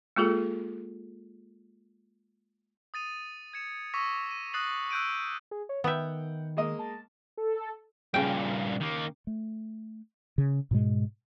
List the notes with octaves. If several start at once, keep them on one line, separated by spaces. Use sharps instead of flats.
G#3 A#3 F4 G#4 A4
D#6 A6 D#7 F7
G#6 C#7 E7
C#6 D6 E6 A#6 B6 D#7
D#7
D#6 F#6 A6 A#6 C7 F#7
E6 F#6 G6 D7 D#7
G#4
C#5
D#3 B3 E5 F#5 G5
G#3 A#3 D#5
A5
A4
G2 A#2 C#3 G5
D#3 A#3
A3
C#3
G#2 B2 G#3